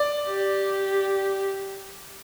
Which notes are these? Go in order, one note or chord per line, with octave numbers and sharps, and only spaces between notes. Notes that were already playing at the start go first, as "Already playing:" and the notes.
Already playing: D5
G4